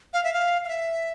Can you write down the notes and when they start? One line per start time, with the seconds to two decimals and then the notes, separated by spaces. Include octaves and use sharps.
0.13 F5
0.24 E5
0.33 F5
0.64 F5
0.68 E5